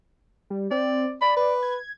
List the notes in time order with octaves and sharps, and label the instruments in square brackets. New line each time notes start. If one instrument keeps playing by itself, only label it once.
[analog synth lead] G3
[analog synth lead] C4 [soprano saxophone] D5
[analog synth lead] D5 [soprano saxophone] B5
[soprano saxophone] B4
[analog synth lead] G#6